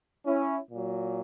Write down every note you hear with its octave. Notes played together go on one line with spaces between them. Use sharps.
C#4 E4
A#2 F#3